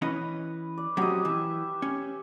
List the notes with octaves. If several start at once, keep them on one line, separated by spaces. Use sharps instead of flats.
E3 C#4 B4 D#5 D#6
D5
F#3 C4 C#4 G4 D#5
E3 E5
C#4